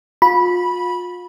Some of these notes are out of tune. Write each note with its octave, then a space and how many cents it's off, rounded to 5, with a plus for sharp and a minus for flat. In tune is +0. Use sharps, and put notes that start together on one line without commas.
F4 +35 B5 -15